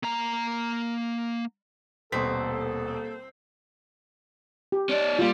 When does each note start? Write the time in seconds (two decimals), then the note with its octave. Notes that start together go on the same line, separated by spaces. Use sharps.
0.03 A#3 A#5
2.12 D#1 B2 A#3 C4 A4 B6
4.72 G4
4.89 C#4 D5
5.19 G3 A#3 F4